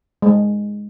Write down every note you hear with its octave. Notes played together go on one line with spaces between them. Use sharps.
G#3